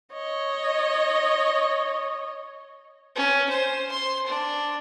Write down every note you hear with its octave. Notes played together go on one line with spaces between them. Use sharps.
C#5 D#5
C#4
C5
C6
D4